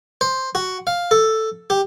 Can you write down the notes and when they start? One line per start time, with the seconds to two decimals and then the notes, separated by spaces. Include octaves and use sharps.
0.21 C5
0.55 F#4
0.87 F5
1.11 A4
1.70 G4